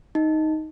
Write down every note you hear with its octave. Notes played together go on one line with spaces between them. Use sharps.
D#4